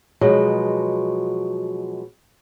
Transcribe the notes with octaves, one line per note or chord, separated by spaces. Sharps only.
B2 F3 F#3 G#3